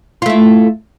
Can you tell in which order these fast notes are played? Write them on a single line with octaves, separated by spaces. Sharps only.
F4 A3 E4